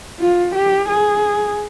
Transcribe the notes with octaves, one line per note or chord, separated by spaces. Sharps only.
F4
G4
G#4